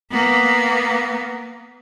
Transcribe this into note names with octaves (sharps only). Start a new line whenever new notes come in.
A#3 B3